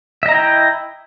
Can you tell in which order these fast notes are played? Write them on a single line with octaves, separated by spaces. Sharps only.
E5 D#5 A#5 E4 G5